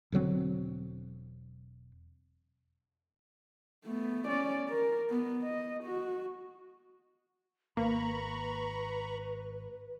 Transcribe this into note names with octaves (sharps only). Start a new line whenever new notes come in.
E1 D3 F#3 C4
A3 B3
C#4 D5
A#4
B3
D#5
F#4
G#1 A#3 B4 A#5 B5 C#6